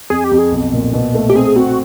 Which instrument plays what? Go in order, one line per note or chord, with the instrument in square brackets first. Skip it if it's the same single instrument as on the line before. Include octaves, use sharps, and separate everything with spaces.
[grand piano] F2 [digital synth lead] G#4
[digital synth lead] G4
[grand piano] F2
[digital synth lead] G#4
[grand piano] B1
A#2
B2
A3
[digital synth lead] G4
[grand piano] C4 [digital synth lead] G#4
[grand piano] C4 [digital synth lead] F#4